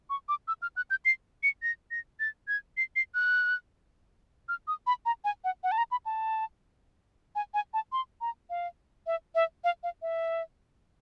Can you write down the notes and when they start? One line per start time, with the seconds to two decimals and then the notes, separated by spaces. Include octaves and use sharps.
0.10 C#6
0.29 D6
0.48 E6
0.62 F6
0.77 F#6
0.90 G6
1.05 C7
1.43 C#7
1.63 A#6
1.91 A#6
2.20 A6
2.48 G#6
2.77 C7
2.96 C7
3.15 F#6
4.49 F6
4.68 D#6
4.87 B5
5.06 A#5
5.24 G#5
5.44 F#5
5.64 F#5
5.72 A5
5.78 A#5
5.91 B5
6.06 A5
7.35 G#5
7.54 G#5
7.74 A5
7.92 C6
8.21 A#5
8.50 F5
9.07 E5
9.35 E5
9.64 F5
9.83 F5
10.02 E5